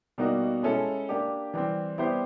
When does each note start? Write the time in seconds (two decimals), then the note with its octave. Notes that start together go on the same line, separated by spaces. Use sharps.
0.18 B2 G3 A#3 D#4 F#4
0.63 G#3 C#4 E4 A4
1.09 A#3 D4 G4
1.54 E3 G3 C4
1.98 G3 B3 E4 G4 C5